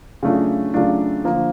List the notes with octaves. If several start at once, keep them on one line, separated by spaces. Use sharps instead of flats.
C#3 F#3 A3 D4 F4
C#3 F#3 A3 D4 F4
D3 F3 A#3